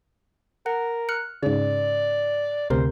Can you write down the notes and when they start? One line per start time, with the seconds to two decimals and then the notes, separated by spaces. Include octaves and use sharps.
0.66 A#4 F#5
1.09 F6 F#6 C#7
1.43 G#2 C#3 D5
2.70 D2 C3 A#4 C5